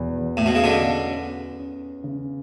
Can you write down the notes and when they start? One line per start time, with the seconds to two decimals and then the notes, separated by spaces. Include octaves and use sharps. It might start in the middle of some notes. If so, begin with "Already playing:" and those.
Already playing: E2 B2
0.18 E2
0.37 A2
0.46 B2
0.55 C#3
0.64 B2 D3 C#4
1.11 C#4
1.58 C#4
2.04 C#3